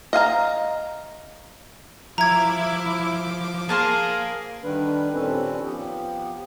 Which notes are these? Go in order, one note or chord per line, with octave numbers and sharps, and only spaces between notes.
D#5 F5 G#5 A#5
F3 E4 A#5 D6 G#6
A#3 G#4 A#4 C5 F5 A5
D3 D#3 G3 D4 B4
D#2 A#2 C4 C#4 A4 B4
F3 B3 G4